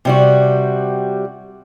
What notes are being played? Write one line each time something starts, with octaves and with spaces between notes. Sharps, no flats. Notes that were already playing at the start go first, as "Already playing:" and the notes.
C3 G3 F#4